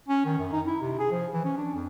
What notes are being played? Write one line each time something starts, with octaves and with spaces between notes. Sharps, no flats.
C#4
D#3
F#2
D#4
E4
C3
G#4
F3
E3
C#4
D4
F2